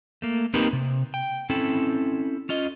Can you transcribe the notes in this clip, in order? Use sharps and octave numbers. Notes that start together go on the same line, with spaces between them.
A3 A#3
A#3 C4 D#4 G4 A#4 B4
C3
G5
C4 C#4 E4 A4
C#4 F4 D#5